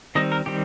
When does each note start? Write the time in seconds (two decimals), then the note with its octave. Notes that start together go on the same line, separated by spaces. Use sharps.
0.15 D#3 G3 C4 D#5
0.32 A#4
0.46 D#3 G3 C4 G4